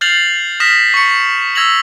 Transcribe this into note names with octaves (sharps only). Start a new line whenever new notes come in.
F6 G6 A6 C7 F7 F#7
D#6 F6 A#6 B6 E7
C#6 C#7
E6 G#6 A#6 F7 F#7